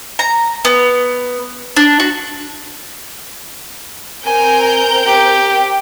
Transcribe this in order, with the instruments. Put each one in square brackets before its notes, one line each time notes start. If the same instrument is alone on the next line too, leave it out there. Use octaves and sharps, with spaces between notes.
[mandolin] A#5
B3
D4
F#4
[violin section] C4 A#4 G6 [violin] G#5
[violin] G4